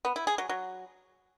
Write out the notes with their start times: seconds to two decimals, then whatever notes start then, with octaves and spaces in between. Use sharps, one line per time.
0.05 B3
0.16 E4
0.27 G#4
0.38 F#3
0.49 F#3